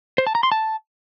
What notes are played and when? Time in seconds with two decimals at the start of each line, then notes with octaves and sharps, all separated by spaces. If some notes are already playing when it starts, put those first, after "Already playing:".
0.18 C5
0.27 A5
0.35 A#5
0.43 C6
0.52 A5